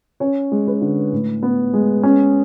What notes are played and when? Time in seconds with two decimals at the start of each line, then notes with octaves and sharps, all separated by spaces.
0.20 C#4 C#5
0.52 G#3
0.67 B4
0.81 D3
1.12 A2
1.43 B3
1.73 G#3
2.03 C#4